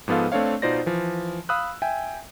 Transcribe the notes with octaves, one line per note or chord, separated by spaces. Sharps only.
G#2 F3 B3 A4 F5
A3 C4 D4 C#5 F5
B2 D#4 F4 C5 D5 A#6
E3 F3
F5 B5 D#6 E6 F#6
E5 G5 G#5